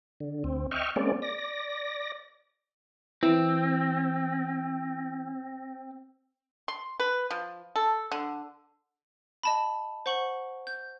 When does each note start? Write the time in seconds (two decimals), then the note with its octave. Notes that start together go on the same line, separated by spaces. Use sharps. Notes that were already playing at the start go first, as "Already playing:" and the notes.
0.20 D3
0.44 D2 C4
0.71 D#5 E5 G5 C#6 F6
0.96 G#3 A#3 C4 C#4 D5
1.22 D5 A#6
3.23 E3 C4
6.68 C6
7.00 B4
7.31 F3
7.76 A4
8.12 D3
9.43 D#5 A5 B5
10.06 C5 F#5 C#6 F#7
10.67 G6